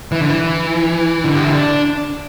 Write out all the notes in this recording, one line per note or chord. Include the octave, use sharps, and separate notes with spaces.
E3
D3
E3
D3
G4
E4
D4